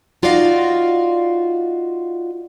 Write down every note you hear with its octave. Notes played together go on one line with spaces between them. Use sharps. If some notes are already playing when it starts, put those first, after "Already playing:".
D#4 F4 F#4 D5 D#5 F5